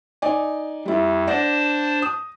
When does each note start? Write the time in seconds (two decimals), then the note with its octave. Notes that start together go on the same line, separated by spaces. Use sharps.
0.22 D#4 D5 G#5
0.85 F2 G3 E4
1.27 D4 C5 D5 F#5 A5 A#6
2.02 D#6